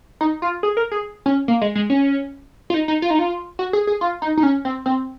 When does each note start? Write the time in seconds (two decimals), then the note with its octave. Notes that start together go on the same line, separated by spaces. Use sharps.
0.21 D#4
0.42 F4
0.63 G#4
0.77 A#4
0.92 G#4
1.26 C#4
1.48 A#3
1.61 G#3
1.75 G#3
1.90 C#4
2.70 F4
2.74 D#4
2.88 D#4
3.02 F4
3.10 D#4
3.19 F4
3.59 F#4
3.73 G#4
3.87 G#4
4.01 F4
4.22 D#4
4.37 D#4
4.43 C#4
4.65 C4
4.86 C4